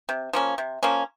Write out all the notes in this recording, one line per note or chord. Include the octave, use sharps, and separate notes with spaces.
C3
F3 A#3 C#4
C3
F3 A#3 C#4